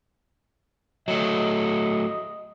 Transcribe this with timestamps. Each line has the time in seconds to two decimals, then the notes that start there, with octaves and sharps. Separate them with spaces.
1.08 F#3 A3 D#5